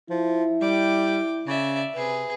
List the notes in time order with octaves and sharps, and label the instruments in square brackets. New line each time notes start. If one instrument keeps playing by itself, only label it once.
[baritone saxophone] F3 [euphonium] E4
[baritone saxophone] G3 [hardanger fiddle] G5 D6
[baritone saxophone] C#3 [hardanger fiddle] D5 E5
[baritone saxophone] C3 [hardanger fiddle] G#4 B4